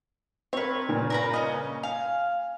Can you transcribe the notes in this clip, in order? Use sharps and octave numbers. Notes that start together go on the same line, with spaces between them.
C4 A#4 B4 C#5
G2 A#2 C#3
A#4 B4 A#5
C#4 D#5
F5 G#5